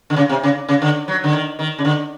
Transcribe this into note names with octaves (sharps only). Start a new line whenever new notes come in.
D3
C#3
C3
C#3
C#3
D3
F#3
D3
D#3
D#3
C#3
D3